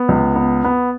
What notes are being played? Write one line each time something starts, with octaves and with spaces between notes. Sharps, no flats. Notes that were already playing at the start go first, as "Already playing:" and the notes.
Already playing: B3
C#2
B3
B3